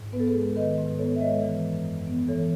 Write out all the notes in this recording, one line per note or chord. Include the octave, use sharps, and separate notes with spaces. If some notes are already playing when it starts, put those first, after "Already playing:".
Already playing: G#2
B3 B4
A4
G#4 B4
G#3
D#3 B4 D#5
G#2
B3 A4 C#5
E5
G#3 B4 D#5
E3
F#2
F#2
B3
E3 A4 C#5